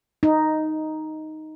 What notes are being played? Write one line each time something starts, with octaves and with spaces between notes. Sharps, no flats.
D#4